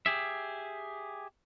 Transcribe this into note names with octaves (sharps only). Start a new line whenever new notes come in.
G4 G#4 E5